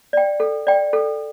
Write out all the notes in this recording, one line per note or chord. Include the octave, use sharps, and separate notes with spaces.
D5 G5
A4
D5 G5
A4